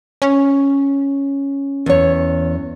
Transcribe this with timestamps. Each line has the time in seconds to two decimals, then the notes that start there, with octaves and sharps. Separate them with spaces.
0.22 C#4
1.86 E2 C#5